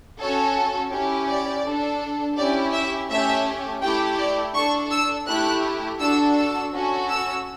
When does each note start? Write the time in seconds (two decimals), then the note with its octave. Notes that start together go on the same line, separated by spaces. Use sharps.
0.20 C#4 F#4 A4 C#5
0.92 C#4 E4 G4
1.28 D5
1.65 D4 A4
2.37 C#4 E4 G4 D5
2.73 E5
3.10 A3 C#4 G4 E5
3.82 A3 E4 G4 G5
4.18 D5
4.54 D4 A4 C#6
4.91 E6
5.27 A3 E4 G4 F#6
6.00 D4 F#4 A4 E6
6.36 E6
6.73 C#4 F#4 A4
7.09 E6